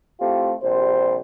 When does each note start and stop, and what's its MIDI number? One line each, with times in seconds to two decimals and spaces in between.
0.21 0.54 57
0.21 0.54 60
0.21 0.54 64
0.21 0.54 65
0.21 0.54 67
0.63 1.17 34
0.63 1.17 48
0.63 1.17 55
0.63 1.17 72